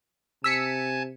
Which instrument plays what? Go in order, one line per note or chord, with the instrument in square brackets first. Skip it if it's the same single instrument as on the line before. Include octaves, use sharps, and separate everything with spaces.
[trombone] C3 [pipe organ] G#5 A5 G#6 [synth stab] E6 B6 C#7